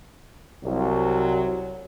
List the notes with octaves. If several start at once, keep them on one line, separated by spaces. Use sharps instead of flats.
C2 F#3